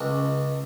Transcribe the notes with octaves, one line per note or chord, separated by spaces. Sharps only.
C#2